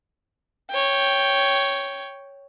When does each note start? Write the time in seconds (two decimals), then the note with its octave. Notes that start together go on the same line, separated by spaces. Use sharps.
0.71 C#5 G5